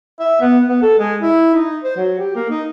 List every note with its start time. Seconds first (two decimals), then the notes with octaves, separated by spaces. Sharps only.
0.20 E5
0.41 B3
0.68 B3
0.82 A4
0.99 G#3
1.21 E4
1.54 D#4
1.84 C5
1.97 F#3
2.19 G4
2.35 A#3
2.50 D#4